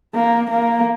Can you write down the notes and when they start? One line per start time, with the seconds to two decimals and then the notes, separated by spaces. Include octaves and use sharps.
0.14 A#3
0.50 A#3